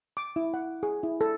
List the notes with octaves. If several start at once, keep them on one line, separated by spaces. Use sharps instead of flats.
D6
E4
F#5
G#4
E4
A4